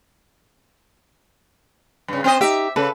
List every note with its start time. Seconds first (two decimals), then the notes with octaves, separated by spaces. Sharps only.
2.08 G2 C#3
2.24 C4 C5 D#5
2.41 D#4 G4 E5
2.76 C#3 A4 B4